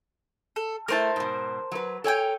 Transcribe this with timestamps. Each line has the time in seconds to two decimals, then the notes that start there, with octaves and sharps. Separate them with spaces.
0.56 A4
0.88 A3 E4 A#4 C5 A5
1.16 G#2 B2
1.72 F#3 B4
2.04 A4 A#4 C#5 G5 G#5